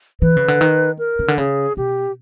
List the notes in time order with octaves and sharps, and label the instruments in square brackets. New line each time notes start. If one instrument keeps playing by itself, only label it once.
[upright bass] E3 [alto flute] B4
[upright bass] C#3
D3
D#3
[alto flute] A#4
[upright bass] C#3
D3
[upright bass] C#3 [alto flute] G#4
[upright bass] B2 [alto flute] G4